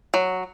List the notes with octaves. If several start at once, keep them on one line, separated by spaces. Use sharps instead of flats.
F#3